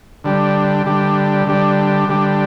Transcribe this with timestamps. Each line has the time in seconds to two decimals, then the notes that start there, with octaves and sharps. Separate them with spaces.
0.24 D3 G3 D4 G4
0.86 D3 G3 D4 G4
1.47 D3 G3 D4 G4
2.09 D3 G3 D4 G4